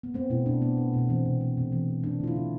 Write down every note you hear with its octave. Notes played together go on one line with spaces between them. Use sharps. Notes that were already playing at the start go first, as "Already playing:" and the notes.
B3
A3 C4
B2 E4
B2 D4
A3 B3
A3
B2 D4
E3 C4
C3
A3
C3
E3
C3
A3 D4
D3 F4
E4
D3